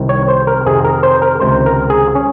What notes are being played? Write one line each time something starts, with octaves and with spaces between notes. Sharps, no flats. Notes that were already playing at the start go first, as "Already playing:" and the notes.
Already playing: C2 C3 D#3
C#5
C5
A#4
F2 C3 D#3 G#4
A#4
C5
A#4
C#2 C3 D#3 C5
A#4
G#4
C#4